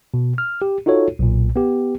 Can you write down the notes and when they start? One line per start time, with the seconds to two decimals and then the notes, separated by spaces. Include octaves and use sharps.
0.14 B2
0.38 F6
0.62 G4
0.86 D#4 F4 F#4 A4 C#5
1.19 B1 A#2
1.56 B3 G4